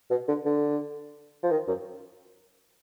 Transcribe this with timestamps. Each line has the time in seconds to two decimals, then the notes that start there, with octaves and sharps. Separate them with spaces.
0.10 B2
0.28 D3
0.45 D3
1.43 F3
1.51 D#3
1.67 F#2